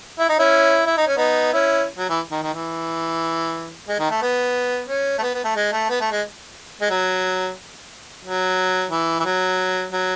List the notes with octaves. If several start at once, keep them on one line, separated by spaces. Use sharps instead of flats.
E4
D#4
C#4 E4
E4
D#4
C#4
B3 D#4
C#4 E4
F#3
E3
D#3
D#3
E3
G#3
D#3
A3
B3
C#4
A3
B3
B3
A3
G#3
A3
B3
A3
G#3
G#3
F#3
F#3
E3
E3
F#3
F#3